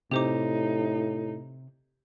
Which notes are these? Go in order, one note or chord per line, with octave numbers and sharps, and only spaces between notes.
A2 C3 D#4 G4 C5 D6